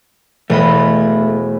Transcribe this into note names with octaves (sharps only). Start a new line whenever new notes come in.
E1 A3 D#5 B5